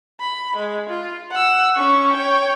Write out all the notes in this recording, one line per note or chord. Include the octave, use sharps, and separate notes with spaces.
B5
G#3
F4
F#5 E6
C#4 C#6
C#5 G5